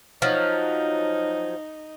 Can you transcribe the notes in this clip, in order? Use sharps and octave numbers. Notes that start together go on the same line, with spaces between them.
F3 F#3 D#4